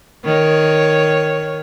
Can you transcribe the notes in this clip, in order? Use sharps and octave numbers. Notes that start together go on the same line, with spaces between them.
D#3 C#5